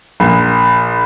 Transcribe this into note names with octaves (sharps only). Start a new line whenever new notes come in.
A#1